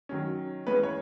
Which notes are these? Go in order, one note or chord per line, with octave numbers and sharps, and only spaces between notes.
D#3 F#3 C#4
E3 G#3 B3 C#4 B4
C#5